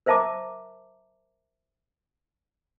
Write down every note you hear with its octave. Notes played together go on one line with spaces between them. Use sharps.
A#4 C5 E5 A5 A#5 D6